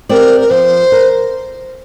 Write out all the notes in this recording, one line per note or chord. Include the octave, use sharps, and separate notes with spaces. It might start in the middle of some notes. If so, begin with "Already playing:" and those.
C4 G4 A#4 D5
A#4
F3 C5
A#4